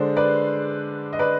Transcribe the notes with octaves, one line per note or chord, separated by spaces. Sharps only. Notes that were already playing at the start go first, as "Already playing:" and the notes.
Already playing: D3 G#3 D4 C5
B4 D5
D#5
B4 D5